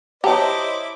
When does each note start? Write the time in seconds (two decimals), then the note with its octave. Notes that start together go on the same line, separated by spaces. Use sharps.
0.24 E4 G4 C5 C#5 D#5 A5 A#5 D6